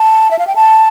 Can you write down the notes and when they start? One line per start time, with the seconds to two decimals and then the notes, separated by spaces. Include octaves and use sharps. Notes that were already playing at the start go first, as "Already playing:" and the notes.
Already playing: A5
0.31 E5
0.39 F5
0.47 G5
0.56 A5